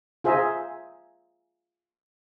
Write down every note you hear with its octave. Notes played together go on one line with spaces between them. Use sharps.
F4 G#4 C5 E5 G#5 A#5